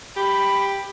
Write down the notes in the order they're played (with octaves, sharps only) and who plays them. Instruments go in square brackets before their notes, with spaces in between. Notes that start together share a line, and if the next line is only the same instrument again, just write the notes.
[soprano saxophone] G4 [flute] B5